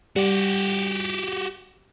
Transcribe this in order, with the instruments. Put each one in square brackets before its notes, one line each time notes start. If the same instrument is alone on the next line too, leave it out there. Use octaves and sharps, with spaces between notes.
[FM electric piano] G3 [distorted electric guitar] F#4 G4